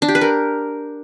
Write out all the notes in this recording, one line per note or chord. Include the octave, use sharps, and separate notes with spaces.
D4
G4
B4
A#4